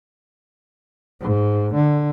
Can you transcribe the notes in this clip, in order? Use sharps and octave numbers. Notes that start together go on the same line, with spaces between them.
G#2
D3